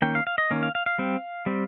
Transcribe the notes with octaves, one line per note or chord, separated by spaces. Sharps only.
D#3 A#3 C#4 G5
F5
F5
D#5
D#3 A#3 C#4
F5
F5
F5
G3 C4
G3 C4